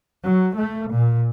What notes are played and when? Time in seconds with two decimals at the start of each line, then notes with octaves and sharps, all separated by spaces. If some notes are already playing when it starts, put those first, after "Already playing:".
0.23 F#3
0.56 A3
0.92 A#2